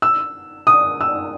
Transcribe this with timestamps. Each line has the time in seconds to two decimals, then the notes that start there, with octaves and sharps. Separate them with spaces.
0.02 E6
0.67 D#6
1.01 E6